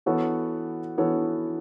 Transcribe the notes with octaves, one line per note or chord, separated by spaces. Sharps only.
E3 B3 F#4 A4 C#5
E3 B3 F#4 A4 C#5